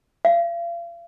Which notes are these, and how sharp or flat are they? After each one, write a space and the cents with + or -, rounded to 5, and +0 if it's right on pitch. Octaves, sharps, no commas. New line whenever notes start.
F5 -35